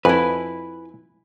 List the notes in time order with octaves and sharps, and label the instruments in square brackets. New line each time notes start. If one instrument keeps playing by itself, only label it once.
[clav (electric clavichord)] F2 [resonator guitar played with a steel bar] E4 G#5 [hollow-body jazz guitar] B4